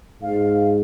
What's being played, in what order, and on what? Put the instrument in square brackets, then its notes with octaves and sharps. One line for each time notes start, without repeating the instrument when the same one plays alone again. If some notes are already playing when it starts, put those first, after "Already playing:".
[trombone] G#2 [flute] F5